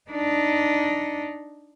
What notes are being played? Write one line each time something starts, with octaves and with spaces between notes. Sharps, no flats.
D4 D#4